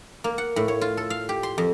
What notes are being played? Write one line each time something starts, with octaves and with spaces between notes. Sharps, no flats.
A#3
F#5
A2
C#5
F4
A4
F5
G4
C6
F2